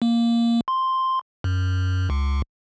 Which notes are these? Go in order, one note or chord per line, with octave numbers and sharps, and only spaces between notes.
A#3
C6
F#2
C#2